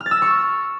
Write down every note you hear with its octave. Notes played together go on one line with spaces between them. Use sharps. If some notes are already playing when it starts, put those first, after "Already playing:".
F6
A6
E6
A#6
C#6